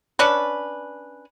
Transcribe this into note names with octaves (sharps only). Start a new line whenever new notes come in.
C#4 D4 B4